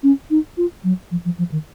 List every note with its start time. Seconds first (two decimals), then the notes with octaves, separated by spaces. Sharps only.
0.03 C#4
0.31 D#4
0.57 F4
0.84 F#3
1.11 F3
1.25 F3
1.38 F3
1.52 D#3